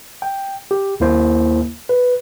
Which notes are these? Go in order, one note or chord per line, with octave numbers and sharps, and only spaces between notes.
G5
G4
D#2 A#3 E4 C5
B4